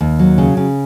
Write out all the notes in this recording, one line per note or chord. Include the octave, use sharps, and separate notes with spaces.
D#2
F#3
C#3
C#3